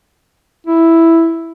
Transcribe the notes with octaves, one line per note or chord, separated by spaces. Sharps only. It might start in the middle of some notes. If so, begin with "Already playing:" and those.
E4